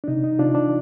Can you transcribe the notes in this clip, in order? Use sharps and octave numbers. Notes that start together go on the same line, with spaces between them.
D4
C3 D#4
D#4
C3 D4 F4
D4